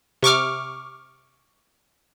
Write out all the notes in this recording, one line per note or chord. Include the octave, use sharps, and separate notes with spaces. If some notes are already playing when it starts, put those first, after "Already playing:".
C3 C#6 D6 F6